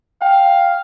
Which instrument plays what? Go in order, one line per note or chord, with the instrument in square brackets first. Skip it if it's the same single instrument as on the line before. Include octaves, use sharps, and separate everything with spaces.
[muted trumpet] F5 [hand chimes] G5